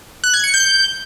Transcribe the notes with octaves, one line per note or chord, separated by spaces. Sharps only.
F#6
G#6
C#7
G6